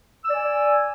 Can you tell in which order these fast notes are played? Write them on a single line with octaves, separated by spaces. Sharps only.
E6 D5 G#5